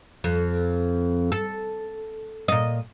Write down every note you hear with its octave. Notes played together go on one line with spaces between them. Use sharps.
F2
A4
A#2 D#5